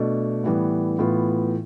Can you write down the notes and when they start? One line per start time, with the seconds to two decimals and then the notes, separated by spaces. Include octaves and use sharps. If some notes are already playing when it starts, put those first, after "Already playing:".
Already playing: B2 A3 D4
0.44 A2 E3 G3 B3
0.99 A2 E3 B3 F4